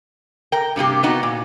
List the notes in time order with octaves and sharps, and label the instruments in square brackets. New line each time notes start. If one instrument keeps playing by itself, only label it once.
[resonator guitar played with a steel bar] A#4 G5
G2 C3 A#3 G4
B3 D#4 F4 F#4
A#2